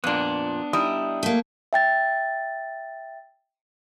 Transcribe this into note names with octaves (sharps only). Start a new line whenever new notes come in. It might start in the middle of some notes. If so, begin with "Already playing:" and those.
F2 A#2 B3 D4 F#6
G3 D#4 E4 D#6
A3 A#3
E5 G5 A6